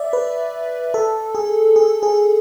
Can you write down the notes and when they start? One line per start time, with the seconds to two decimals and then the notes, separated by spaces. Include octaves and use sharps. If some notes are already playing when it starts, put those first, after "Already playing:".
Already playing: D5 E5
0.13 B4
0.94 A4
1.35 G#4
1.76 G#4
2.03 G#4